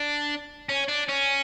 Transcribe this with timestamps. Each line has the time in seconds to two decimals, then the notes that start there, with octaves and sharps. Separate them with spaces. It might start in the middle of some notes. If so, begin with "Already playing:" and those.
Already playing: D4
0.69 C#4
0.88 D4
1.09 C#4